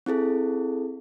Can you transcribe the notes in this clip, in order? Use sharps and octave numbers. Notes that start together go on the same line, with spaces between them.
C4 E4 G#4 A4